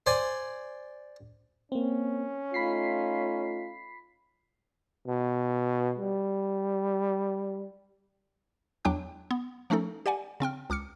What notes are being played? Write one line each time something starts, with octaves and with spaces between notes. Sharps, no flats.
C5 D5 G#5
A#3 C4 C#4
A3 D#4 F4 B5 B6 C7
B2
G3
E2 F#3 D4 G5 D6 F#6
B3
F3 A3 C#4 D#4 A4
G4 D5 F#5 G#5
C#3 C4 G5 F6
C#2 D6 F6 C#7